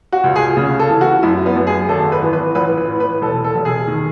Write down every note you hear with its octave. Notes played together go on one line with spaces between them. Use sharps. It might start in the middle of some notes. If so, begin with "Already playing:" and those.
F#4
C#2
G#4
C#3
A4
E3
F#4
F#2 E4
B3
F#2
G#4
G#1 A4
B4
E3
B4
A1 B4
B4
A2
B4
E1 A4
A4
E1
G#4
D#3